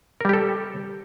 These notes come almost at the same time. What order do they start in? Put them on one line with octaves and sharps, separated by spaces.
A#4 G3 G4 A4